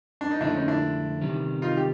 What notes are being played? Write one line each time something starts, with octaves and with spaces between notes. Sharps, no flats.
D4
D#4
F2 D3 F3 A3 D4 E4
C#4 D#4
D4 E4
E2 C3 D#3 G3
D#4 F4
G4